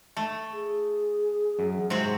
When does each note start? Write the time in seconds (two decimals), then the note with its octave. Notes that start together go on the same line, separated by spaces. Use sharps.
0.17 A3
0.53 G#4
1.59 F#2
1.90 G#2 C3 C4 F#4